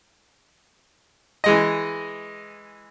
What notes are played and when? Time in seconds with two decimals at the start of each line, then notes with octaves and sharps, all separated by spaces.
1.44 E3 G#3 D#5